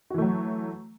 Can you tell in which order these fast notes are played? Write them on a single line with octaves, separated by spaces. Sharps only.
F#4 E3 A3 F#3